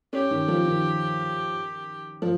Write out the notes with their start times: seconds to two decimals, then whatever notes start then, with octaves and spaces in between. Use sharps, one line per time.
0.13 C#4 G4
0.30 D#3
0.48 F3
0.65 D#3
2.22 F3